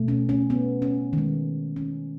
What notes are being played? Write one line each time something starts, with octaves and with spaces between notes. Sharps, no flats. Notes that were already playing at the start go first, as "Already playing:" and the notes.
Already playing: B2 A3
C#4
C#4
B3
C#4
D#3 G#3
C#4